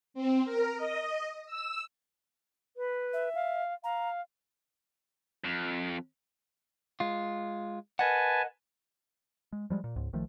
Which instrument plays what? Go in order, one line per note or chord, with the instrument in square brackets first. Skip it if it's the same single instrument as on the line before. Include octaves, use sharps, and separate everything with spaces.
[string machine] C4
A#4
D#5
E6
[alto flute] B4
[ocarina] E5
[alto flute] F5
[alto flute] F5 [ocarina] A#5
[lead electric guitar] F2
[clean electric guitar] G#3 F4
[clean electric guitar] A#4 D#5 F#5 [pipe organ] B4 G#5 A5
[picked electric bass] G#3
F3 G3 G#3
A#2
C#2 G#2
A#1 D#3 F3 A3